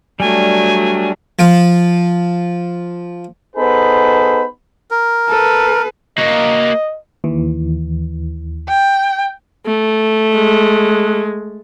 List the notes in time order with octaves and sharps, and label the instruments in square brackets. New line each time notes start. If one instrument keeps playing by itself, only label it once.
[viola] F#3 A3 [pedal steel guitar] G3 D4 [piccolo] G#5
[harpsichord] F3 F4
[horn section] B3 D#4 G#4 A4 C5 B5
[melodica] A#4
[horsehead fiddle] A4 B4
[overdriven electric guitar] A#3 F#4 [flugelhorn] D#5
[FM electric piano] D#2 E3
[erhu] G5
[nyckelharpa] A3
[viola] G#3